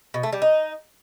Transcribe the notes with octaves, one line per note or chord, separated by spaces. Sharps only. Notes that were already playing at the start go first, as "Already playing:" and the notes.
B2
A3
G3
D#4